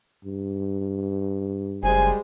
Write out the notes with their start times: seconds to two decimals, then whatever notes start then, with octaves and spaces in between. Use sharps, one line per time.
0.24 G2
1.83 F#1 G3 G#3 C5 G#5